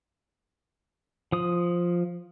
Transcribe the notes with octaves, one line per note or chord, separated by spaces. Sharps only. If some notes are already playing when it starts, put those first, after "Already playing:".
F3 D#6